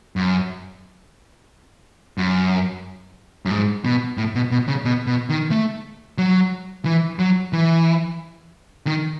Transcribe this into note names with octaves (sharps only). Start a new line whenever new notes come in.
F#2
F#2
F#2
G#2
B2
A2
B2
B2
C#3
B2
B2
D#3
A3
F#3
E3
F#3
E3
D#3